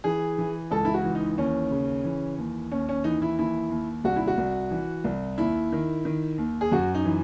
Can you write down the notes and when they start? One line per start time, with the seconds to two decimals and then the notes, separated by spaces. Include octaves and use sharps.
0.04 E3 G#4
0.38 E3
0.71 C#2 A4
0.85 E4
0.94 F#4
1.04 E3
1.15 D#4
1.37 D#2 C#4
1.71 C#3
2.04 E3
2.38 D#2
2.71 D#2 C#4
2.89 C#4
3.04 E3 D#4
3.22 E4
3.38 D#2 E4
3.71 D#2
4.04 C2 F#4
4.16 E4
4.27 F#4
4.38 C2
4.71 E3
5.04 C2
5.38 D#2 E4
5.72 D#3
6.05 D#3
6.38 D#2
6.61 G#4
6.72 F#2 F#4
6.95 D#4
7.05 E3